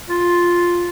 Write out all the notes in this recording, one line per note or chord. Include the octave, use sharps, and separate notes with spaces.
F4